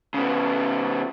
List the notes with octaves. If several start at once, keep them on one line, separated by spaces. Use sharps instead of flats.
C#3 B3